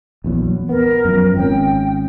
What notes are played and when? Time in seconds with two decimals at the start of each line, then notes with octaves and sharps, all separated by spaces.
0.24 A#1 E2 F#3
0.69 B3 A#4
1.05 F#2 F3
1.37 G#1 C#4 G5